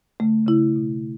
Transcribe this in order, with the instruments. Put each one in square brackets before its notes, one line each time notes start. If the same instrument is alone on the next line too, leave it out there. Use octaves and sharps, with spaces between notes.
[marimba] C#3 A3
C#3 E4
B2